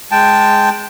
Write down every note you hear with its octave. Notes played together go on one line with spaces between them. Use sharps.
G#3 G5 A5